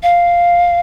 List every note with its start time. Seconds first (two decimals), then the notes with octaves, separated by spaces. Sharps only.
0.03 F5